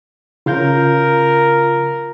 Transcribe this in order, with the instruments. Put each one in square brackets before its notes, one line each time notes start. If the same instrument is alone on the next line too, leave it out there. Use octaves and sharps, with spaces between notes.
[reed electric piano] C#3 F5 G6 [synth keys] F4 [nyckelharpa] A#4